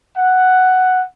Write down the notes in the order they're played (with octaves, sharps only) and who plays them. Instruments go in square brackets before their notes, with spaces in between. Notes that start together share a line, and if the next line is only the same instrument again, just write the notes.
[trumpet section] F#5